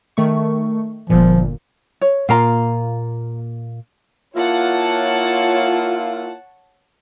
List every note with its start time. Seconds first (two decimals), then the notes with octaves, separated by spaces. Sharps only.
0.17 D#3 A3 C#6
1.10 G1 A#2 F3
2.01 C#5
2.29 A#2 A#3 F4 F5 A#5
4.36 A#3 E4 F4 C#5 F#5 A5